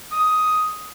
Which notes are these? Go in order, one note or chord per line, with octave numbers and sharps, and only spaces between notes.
D#6